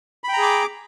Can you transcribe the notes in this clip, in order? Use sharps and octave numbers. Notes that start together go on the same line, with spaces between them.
G#4 G5 A#5 B5 D6